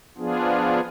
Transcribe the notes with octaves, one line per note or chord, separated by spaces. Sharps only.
F3 B3 D4 F4 G#4